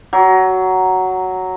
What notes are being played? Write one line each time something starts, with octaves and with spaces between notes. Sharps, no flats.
F#3